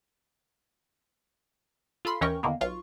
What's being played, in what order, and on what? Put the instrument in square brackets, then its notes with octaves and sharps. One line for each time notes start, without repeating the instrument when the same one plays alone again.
[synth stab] F4 A4 B5 C6
D#2 E3 C#4 A#4 G5 C#6
E2 D3 D#3 A#3 B3
B1 F4 C#6